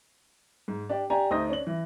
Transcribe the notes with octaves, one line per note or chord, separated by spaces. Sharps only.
G#2
D4 G4 D5
D4 G4 G#5 A#5
D2 D#4 C5 D#6 A#6
C#4 D4 F#7
E3